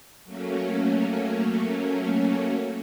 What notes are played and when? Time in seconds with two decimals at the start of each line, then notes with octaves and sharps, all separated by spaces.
0.24 F#3 A3 A#3 C#4